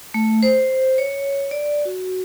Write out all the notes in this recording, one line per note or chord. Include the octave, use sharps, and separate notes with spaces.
A3
C5
C#5
D5
F#4